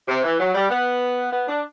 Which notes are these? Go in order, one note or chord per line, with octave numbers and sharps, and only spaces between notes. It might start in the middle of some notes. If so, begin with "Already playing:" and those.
C3
E3
F#3
G3
B3
B3
D4